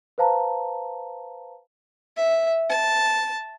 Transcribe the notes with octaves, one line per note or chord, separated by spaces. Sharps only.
B4 C5 F5 A5 A#5
E5
A5